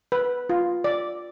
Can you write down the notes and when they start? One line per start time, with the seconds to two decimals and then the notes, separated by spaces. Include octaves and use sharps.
0.12 B4
0.49 F4
0.84 D5